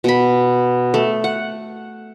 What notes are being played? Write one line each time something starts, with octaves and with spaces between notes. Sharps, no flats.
B2 B5
A3
F#5